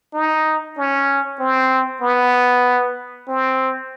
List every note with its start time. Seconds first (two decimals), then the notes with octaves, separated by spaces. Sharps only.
0.14 D#4
0.77 C#4
1.40 C4
2.02 B3
3.28 C4